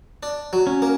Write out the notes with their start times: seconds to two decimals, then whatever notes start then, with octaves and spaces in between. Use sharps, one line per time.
0.23 D4
0.53 F#3
0.67 C#4
0.82 A#3